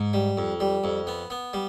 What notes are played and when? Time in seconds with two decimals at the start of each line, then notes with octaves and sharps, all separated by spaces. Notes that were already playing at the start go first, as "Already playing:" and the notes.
Already playing: G#2
0.13 G3
0.37 F2
0.60 G3
0.84 F2
1.07 B3
1.30 B3
1.53 G3